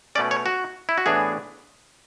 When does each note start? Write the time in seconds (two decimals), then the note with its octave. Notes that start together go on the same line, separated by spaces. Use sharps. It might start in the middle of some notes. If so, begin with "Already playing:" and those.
0.15 B2 A3 C#4 D5
0.31 C#5
0.46 F#4
0.89 E4
0.98 F#4
1.06 A2 E3 B3 D4 G#4